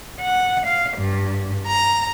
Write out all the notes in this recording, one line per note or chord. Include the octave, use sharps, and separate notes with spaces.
F#5
F5
G2
A#5